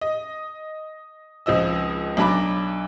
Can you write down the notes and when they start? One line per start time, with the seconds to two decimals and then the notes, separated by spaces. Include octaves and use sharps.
0.01 D#5
1.46 G#1 C#2 F3 D#5 E6
2.17 B1 F#3 D4 A5 B5 D6